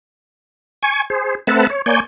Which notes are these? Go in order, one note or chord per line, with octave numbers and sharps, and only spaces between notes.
G#5 C#6
G#4 C5
A3 C4 B4 E5 F#5 A5
C#5
A#3 C#5 D5 G#5 G6